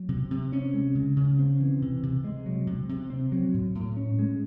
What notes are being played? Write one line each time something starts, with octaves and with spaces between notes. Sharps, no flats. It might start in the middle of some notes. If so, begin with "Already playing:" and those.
Already playing: F#3
C3
C3
C#4
G#3
C#3
C#3
C4
E3
C3
C3
G#3
F#3
C3
C3
C4
F#3
A2
A2
C#4
G#3